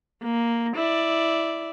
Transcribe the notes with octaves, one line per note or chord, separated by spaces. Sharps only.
A#3
E4 D5